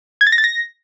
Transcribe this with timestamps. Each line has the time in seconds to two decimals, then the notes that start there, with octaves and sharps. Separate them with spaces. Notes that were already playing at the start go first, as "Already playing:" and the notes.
0.21 G#6
0.27 A6
0.32 A#6
0.38 A6
0.44 A#6